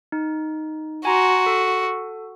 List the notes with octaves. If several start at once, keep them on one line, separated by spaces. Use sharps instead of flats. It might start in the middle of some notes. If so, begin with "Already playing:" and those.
D#4
F#4 G#5 A#5 C6
A4